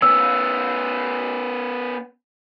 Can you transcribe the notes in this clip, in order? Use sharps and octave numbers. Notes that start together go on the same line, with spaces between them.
B3 C#4 E6